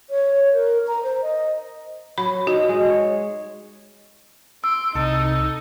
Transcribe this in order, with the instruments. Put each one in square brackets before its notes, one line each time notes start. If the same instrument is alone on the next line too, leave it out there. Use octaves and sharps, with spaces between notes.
[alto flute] C#5
A#4
A#5
C5
D#5
[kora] F#3 [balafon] B5
[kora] D#4 [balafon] F#4
[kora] G#3
C#5
[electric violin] C6 D7 [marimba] E6
[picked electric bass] C2 [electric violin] D#4 D#5 [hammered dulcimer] A4